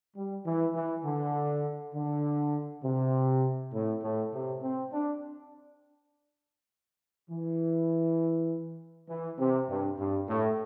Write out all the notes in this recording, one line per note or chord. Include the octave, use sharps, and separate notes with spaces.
G3
E3
E3
D3
D3
C3
A2
A2
C3
C4
D4
E3
E3
C3
G2
G2
A2